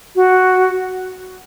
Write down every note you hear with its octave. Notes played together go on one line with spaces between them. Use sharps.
F#4